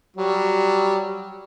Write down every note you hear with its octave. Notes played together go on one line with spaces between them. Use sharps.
F#3 G3